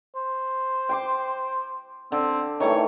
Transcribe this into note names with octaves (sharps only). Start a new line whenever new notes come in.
C5
G5 C6 D6
D3 C4
D#3 E3 A3 C#5